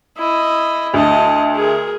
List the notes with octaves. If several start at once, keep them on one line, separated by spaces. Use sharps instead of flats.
E4 D#5
D2 D#5 A5
G#4 A#4